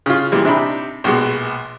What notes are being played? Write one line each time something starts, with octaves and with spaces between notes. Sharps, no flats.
C#3 F4
A#2 E3 G3 G#3
C3 D4 D#4 B5
A#1 B2 G#3